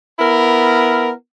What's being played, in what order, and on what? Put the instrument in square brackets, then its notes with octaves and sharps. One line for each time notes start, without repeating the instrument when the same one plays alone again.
[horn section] B3 E4 A#4